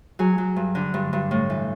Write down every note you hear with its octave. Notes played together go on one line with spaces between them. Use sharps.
F#3 G#4
F#3
G2
D3
G2
G2
A2
E3